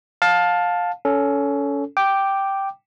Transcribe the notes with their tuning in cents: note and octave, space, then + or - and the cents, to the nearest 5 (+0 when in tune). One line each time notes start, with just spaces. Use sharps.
F5 +20 A5 +0
C#4 +20 A4 +0
G5 -5 D6 +5